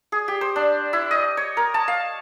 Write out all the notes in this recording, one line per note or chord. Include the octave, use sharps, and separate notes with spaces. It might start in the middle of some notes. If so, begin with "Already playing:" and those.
G#4
G4
C5
D4
E4
D#5
C#5
A#4
A5
F5